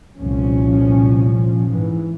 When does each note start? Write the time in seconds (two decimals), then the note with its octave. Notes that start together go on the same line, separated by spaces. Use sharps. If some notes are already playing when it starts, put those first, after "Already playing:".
0.18 F1 C2 A#2 F3 C#4
1.67 G#2 E3